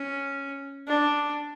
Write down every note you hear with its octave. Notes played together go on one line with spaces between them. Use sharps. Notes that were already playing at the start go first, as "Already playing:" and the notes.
Already playing: C#4
D4